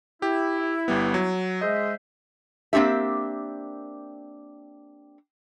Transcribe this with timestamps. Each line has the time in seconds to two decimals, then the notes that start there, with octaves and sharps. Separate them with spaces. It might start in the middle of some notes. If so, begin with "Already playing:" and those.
0.22 E4 G4
0.88 G1 G3 B3
1.14 F#3
1.61 G#3 C5 D#5 E5
2.73 A#3 C4 D4 G4 E5